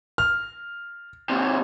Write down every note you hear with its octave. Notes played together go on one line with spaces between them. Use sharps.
F6
D#2 C3